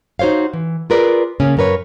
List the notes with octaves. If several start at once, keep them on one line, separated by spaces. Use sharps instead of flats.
D#4 F#4 C5 C#5 F5
E3
F4 G#4 A#4 B4 D5
C#3 A#3 C#4
F#2 C#4 A#4 B4 C#5